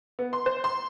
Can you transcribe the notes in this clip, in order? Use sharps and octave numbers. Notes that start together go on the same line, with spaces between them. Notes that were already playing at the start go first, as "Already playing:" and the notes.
B3
C6
C5
C6